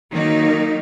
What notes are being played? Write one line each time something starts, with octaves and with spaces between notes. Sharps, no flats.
D#3 F#3 A#3 D#4